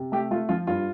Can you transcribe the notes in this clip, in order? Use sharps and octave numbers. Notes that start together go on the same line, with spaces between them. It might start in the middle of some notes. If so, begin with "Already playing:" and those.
Already playing: C3
A3 G4
A3 F4
F3 F4
G2 F4